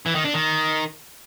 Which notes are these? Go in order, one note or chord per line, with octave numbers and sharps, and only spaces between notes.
E3
D#3
D4
D#3